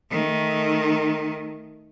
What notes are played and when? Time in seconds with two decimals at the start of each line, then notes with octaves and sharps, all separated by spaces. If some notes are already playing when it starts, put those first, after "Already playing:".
0.10 D#3 A3